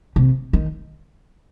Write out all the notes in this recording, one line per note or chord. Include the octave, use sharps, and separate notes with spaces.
C3
D#3